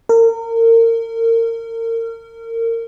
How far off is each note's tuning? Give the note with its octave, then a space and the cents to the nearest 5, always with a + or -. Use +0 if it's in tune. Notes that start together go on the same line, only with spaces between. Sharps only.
A#4 -30